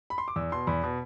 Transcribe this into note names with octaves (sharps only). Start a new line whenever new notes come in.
B5
C6
D6
E2 E6
B2 C6
E2 B5
B2